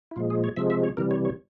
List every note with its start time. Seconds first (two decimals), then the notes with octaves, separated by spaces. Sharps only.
0.11 E4
0.16 A#2 F3 G#3 F4
0.30 G#4
0.44 C#5
0.56 C3 F3 G#3 E5
0.70 E5
0.84 C#5
0.97 C3 E3 G3 A#4
1.11 C#5
1.25 C#5